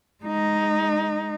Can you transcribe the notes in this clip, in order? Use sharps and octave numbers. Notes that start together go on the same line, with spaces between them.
G#3 D#4